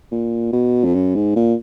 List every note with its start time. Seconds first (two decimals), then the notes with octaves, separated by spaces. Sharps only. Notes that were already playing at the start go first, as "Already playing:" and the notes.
0.12 A#2
0.53 B2
0.84 F2
0.95 F#2
1.15 G#2
1.36 A#2